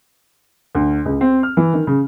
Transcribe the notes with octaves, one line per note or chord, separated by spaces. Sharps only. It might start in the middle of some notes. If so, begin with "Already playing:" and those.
D2
C#2
C4
F6
E3
D#3
C#3